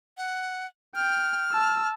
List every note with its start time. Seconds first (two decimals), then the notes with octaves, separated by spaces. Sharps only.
0.17 F#5
0.95 G5 F6
1.53 A5 E6